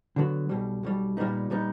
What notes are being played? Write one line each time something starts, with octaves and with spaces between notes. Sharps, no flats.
D3 F#3 B3
B1 B2 G3
B1 B2 G3
A#2 G3 B3 D#4
A#2 G3 B3 D#4